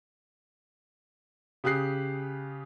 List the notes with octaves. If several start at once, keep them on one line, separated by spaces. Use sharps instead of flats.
C#3 G4 D#6 F#6 C7